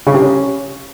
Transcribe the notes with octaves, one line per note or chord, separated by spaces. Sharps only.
C#3
C3
C#4